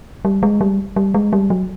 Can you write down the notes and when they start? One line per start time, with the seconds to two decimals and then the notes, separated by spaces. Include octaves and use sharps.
0.25 G3
0.43 G#3
0.61 G3
0.96 G3
1.14 G#3
1.33 G3
1.50 F#3